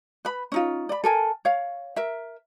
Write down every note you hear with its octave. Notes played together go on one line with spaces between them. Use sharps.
B4 B5
C#4 D#4 F4
D5 B5
A4 A#4 G#5
C#5 F5
A#4 E5